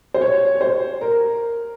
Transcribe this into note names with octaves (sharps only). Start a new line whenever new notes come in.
C5
C#5
C#5
C5
A#4